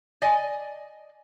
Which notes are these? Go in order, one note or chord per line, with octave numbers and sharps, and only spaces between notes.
D5 D#5 G#5